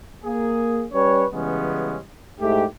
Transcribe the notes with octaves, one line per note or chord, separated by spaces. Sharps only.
A#3 G#4
G3 C#4 B4 C#5
C#3 E3 G3 G#3 B3 C#4
G#2 A3 E4 G4